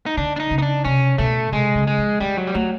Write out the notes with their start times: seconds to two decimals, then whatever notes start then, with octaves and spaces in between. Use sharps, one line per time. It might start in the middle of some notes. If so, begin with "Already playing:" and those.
0.06 D#4
0.17 D3 D4
0.36 D4
0.40 D#4
0.51 C#3
0.58 D#4
0.62 D4
0.85 C3 C#4
1.18 B2 A3
1.52 C3 G#3
1.75 C#3
1.87 G#3
1.98 F3
2.20 G3 G#3
2.37 F#3
2.47 G3
2.54 F#3 A3